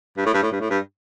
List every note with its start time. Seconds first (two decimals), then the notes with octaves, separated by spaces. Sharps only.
0.17 G2
0.26 A2
0.34 G2
0.43 A2
0.52 G2
0.60 A2
0.70 G2